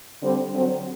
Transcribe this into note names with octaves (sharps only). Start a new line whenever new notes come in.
D3 G3 C4
D3 F#3 C4